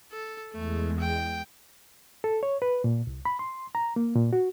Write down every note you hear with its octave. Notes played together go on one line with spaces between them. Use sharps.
A4
E2 G#3 A3
G5
A4
C#5
B4
A#2
C2
B5
C6
A#5
A#3
A#2
F#4